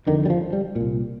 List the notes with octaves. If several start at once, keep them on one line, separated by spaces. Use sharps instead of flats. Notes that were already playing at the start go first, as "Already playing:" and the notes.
F2 D3 D#3
G3
F3
G3
A#2
C2